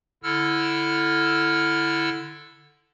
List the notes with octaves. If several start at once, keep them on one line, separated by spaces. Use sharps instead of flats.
D3 E4 A4 E6 F6